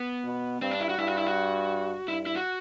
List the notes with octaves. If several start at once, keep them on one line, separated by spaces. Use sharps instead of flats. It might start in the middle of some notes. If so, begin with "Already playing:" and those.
Already playing: B3
B2
G2 C4
D4
E4
F#4
G2 E4
F#4
E4
F#4
G2 E4
E4
F#4